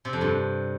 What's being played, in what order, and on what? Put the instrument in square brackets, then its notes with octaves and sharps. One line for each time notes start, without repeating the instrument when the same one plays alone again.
[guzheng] C3
F2
G2